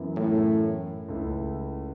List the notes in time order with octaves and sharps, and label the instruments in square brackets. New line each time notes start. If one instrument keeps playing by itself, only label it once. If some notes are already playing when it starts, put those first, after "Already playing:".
Already playing: [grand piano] F#2 E3 B3 E4
[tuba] A2
[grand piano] C#2 C#3 A3 E4